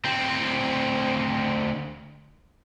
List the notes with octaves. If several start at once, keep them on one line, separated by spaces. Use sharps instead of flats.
D2 C4